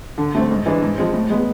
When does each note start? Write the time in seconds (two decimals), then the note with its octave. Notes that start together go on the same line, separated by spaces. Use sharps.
0.18 D3
0.35 A3 C4
0.51 G#2
0.66 E3 G#3 D4
0.82 G#2
0.98 F3 G#3 C4
1.14 A2
1.30 G#3 B3